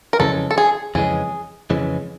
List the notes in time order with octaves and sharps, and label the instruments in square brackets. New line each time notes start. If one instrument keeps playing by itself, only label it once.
[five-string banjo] A#4
[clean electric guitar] F2 C#3 E3 G#3 C#4 [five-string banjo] A4
[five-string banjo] A4
G#4
[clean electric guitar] F2 C#3 E3 G#3 C#4 [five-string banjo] G#4
[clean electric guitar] F2 C#3 E3 G#3 C#4